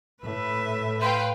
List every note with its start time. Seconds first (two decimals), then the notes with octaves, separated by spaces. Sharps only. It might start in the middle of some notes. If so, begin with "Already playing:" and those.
0.23 A2 B4 E5
1.01 B4 F5 G5 C6